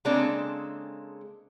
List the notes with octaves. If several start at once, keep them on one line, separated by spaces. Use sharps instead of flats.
C#3 G#3 A#3 C4 D4 A4